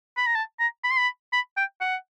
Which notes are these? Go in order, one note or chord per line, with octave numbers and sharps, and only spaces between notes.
B5
A#5
A5
A#5
B5
C6
B5
B5
G5
F#5